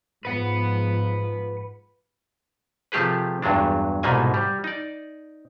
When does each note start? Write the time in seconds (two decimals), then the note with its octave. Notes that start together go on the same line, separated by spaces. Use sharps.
0.25 G#2 F3 B4 F#5
2.92 C3 F3 A3 G4 G#4 B4
3.42 E2 G2 F#3 G#3 D4
4.03 C2 G#2 B2 A3 A#3 G#5
4.34 G3
4.64 D#4 D5